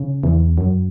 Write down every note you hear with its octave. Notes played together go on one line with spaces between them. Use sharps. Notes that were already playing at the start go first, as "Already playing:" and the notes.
Already playing: C#3
E2
F#2